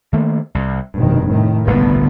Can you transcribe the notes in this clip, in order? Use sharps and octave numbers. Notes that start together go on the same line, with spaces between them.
D#3 A3 A#3
C2
F1 G2 B2 D#3
A2 D#3
G1 C2 A#2 D3 A3 B3